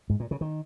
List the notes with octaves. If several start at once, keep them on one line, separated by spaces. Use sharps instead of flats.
G#2
A#2
C#3
D#3